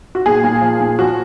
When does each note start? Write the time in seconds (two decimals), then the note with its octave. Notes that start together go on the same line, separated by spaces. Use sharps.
0.15 F#4
0.26 A#2 G#4
0.44 A#2
0.61 F3
0.80 A#2
0.99 F3 F#4